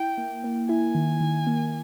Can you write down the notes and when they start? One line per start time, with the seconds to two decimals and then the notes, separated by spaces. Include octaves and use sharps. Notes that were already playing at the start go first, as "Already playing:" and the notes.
Already playing: E4 G5
0.18 A#3
0.44 A#3
0.69 E4 G#5
0.95 D#3
1.21 D#3
1.47 A#3